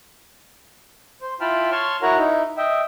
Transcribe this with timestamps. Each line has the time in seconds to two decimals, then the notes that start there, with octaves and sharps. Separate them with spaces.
1.21 C5
1.41 E4 F4 G5 A5 B5 F6
1.72 C#5 A5 C6 C#6 F6
2.02 E4 F#4 A#4 C#5 F#5 A#5
2.17 D#4 E4
2.57 D#5 E5 G5